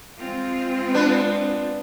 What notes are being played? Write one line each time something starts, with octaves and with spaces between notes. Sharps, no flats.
G#3 C4 F4
B3 D4 B4